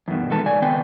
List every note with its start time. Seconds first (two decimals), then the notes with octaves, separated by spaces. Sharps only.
0.08 E2 G2 B2 D#3
0.30 E2 D#3 G#3 A4 B4 A5
0.46 C#3 D5 G#5
0.62 D#3 B3 C4 B4 G5 G#5